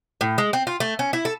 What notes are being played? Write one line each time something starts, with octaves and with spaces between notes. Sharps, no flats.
A2
G#3
C4
F4
A3
C#4
E4
A4